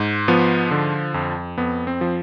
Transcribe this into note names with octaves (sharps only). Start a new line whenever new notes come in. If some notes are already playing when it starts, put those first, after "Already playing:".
Already playing: G#2
F3 B3
D3
F2
F2 B3
C4
F3